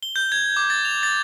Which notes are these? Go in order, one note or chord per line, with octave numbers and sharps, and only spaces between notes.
G7
G6
G#6
D6
A6
F7
A6